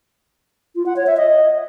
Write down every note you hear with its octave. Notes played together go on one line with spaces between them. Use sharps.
F4
F#5
C#5
E5
D#5